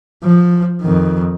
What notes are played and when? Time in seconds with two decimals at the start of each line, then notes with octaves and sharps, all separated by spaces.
0.23 F3
0.82 F2 D#3